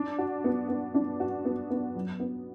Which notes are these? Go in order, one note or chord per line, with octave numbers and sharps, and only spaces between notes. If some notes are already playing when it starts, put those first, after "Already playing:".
Already playing: D4
F#4
B3
B3
D4
F#4
B3
B3
F#3
B3